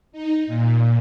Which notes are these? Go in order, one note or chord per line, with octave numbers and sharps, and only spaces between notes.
D#4
A#2